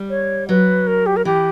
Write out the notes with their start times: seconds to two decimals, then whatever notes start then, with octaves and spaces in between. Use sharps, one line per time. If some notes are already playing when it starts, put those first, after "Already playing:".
Already playing: G3
0.10 C#5
0.49 F#3 B4
0.87 A#4
1.06 G4
1.16 A#4
1.25 E3 G4